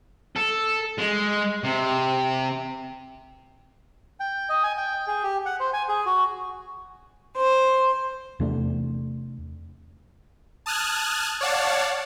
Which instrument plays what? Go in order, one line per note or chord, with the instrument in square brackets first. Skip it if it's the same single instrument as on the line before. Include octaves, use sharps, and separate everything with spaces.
[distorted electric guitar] A4
G#3
C3
[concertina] G5
D#5
G#5
G5
G#4
G4
F#5
C5
G#5
G#4
F#4
[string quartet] C5
[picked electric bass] E2 C3 A3 D4
[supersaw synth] A5 D#6 F6 F#6 G#6
C#5 D5 F5 F#5 A5